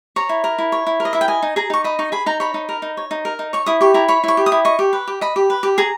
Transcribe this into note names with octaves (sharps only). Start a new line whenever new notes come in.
C#5 A#5
E4
A#4
E4
C#5
E4
A#4
D#5
E4 E5
G5
D#5 G#5
D#4
G#4 A#5
D#4 C#6
D#5 B5
D#4 C#6
G#4 B5
D#4 A#5
C#5 B5
D#4
A#4
D#4
C#5
D#4
A#4
D#4
C#5 C#6
E4 D#6
G4 C#6
E4 A#5
C#5 B5
E4 C#6
G4
D#6
E4
D#5 C#6
G4
B4
G4
D#5 B5
G4
B4
G4
G#4 A#5